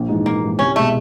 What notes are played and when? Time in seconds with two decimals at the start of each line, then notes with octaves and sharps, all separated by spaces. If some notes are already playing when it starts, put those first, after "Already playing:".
Already playing: A#1
0.09 G#2 E3
0.25 A#1 A#3
0.42 G#2 E3
0.59 C2 C#4
0.75 B2 G#3 A3